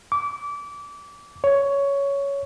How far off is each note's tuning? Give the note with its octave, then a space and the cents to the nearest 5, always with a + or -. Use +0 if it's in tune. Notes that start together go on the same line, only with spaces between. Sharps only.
D6 -25
C#5 +10